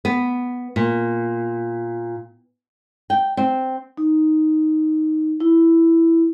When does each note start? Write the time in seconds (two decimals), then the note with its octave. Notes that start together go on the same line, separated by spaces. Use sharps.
0.05 B3
0.76 A#2
3.10 G5
3.37 C4
3.97 D#4
5.40 E4